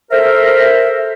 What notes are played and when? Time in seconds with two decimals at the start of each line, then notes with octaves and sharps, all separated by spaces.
0.11 A4 A#4 C5 E5